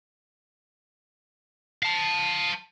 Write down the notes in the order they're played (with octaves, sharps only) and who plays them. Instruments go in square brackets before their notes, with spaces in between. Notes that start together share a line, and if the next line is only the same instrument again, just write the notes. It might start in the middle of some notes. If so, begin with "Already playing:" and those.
[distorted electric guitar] F5 A5